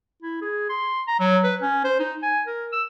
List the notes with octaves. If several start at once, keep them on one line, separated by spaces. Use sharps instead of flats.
E4
G#4
C6
A#5
F#3
B4
C#4
C5
D#4
G#5
A#4
E6